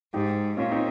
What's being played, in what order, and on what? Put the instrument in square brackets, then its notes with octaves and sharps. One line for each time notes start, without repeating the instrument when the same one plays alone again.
[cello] G#2 [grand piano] D#4 G4
[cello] A#2 [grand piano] C#4 F4
[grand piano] C4 D#4